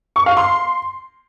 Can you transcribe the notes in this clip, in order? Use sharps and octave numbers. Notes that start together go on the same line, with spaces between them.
C#6
F5
C6